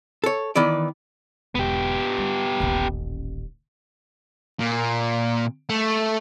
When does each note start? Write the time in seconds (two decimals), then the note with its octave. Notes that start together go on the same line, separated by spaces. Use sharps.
0.24 A4 C#5
0.56 D#3 E3 B3 D5
1.55 E1 B3 G4
2.18 G3
2.60 D#1 A1
4.59 A#2
5.69 A3